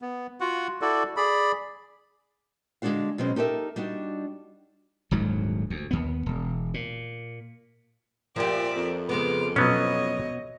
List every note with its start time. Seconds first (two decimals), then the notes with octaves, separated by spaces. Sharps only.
0.02 B3
0.41 F4 F#4 F#5
0.82 E4 F#4 A4 D5
1.17 G#4 D5 B5
2.82 D3 G#3 A3 D4 F#4 F5
3.18 B2 F#3 G#3 C4 C#4
3.36 D#4 G4 A4 A#4 E5
3.76 G3 D4 D#4 F#4
5.11 D#1 D2 G#2 F#3
5.70 D2
5.91 D#2 B3
6.26 E1
6.74 A#2
8.36 A#2 F3 G4 A#4 D5 E5
8.75 F2
9.09 C#3 G#3 B3 D6 F6
9.56 B2 F#3 B3 C#4 C#5 D#5